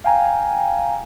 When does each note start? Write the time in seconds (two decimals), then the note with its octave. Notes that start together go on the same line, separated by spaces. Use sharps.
0.04 F5 G5 G#5 A#5